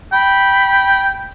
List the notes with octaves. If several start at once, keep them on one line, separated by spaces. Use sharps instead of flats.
G5 B5